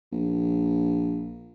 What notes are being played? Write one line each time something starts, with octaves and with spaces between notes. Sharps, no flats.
A#1